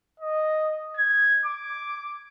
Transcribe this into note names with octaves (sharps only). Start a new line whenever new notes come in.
D#5
G#6
D6